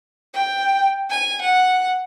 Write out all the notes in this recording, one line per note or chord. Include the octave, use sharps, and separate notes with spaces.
G5
G#5
F#5